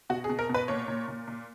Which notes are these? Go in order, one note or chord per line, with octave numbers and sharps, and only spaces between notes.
B2 F#4
G#4
B2
A#4
B2
B4
A#2 C#5
A#2
A#2
A#2